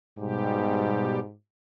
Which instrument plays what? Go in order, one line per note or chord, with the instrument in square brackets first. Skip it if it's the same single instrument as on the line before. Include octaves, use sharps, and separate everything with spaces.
[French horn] G#2 [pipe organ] B2 G3 G4